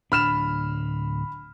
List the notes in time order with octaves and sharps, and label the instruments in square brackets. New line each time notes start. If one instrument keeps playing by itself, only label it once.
[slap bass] D1 D4 [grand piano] B5 F6 E7